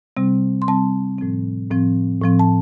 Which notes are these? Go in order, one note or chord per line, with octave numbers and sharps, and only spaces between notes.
C3 G3 C4
C6
C3 G3 C4 A5
A2 F3 C4
A2 F3 C4
A2 F3 C4
A5